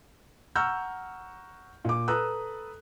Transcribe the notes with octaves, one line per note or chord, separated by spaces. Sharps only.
F#5 A#5 C#6 E6 F6 G6
A#2 D6
A4 B4 A#5 D#6 E6 F#6